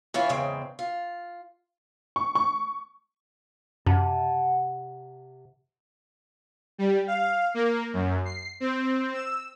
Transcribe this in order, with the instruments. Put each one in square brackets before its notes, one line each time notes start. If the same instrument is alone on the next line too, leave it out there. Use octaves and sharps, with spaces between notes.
[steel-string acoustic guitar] E3 C#4 E4 F4
E2 G#2 C#3 C4
F4
[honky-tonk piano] C#6
C#6
[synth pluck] F#2 [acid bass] C3 [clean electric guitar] F#5 A5
[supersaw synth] G3
F5
A#3
F#2
C7
C4
E6